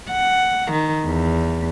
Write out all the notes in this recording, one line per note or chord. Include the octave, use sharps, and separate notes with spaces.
F#5
D#3
E2